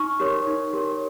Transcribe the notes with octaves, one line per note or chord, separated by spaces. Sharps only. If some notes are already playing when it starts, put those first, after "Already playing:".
Already playing: D#4 C#6 F6
G4 A#4 C#5
D#4
G4 A#4 C#5